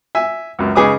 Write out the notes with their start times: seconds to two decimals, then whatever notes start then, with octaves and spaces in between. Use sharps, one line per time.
0.15 E5 G#5
0.59 C#2 F#2
0.75 C#3 D#4 G#4 B4 D6 D#6